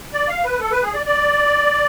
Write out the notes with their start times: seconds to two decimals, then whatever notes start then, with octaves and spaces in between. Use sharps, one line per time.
0.13 D5
0.28 F5
0.44 B4
0.60 A4
0.71 B4
0.83 G#4
0.94 D5
1.06 D5